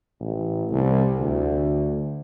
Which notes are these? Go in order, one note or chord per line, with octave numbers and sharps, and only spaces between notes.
A1
C2
D2